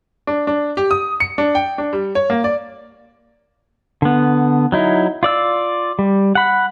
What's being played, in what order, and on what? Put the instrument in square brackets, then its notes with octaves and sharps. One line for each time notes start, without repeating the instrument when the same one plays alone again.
[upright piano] D4
D4
G4
D#6
C#7
D4
G5
D4
G3
C#5
A#3
D5
[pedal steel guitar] D3 B3
F#3 D#4 E4
F4 D5 E6
G3
F#5 B5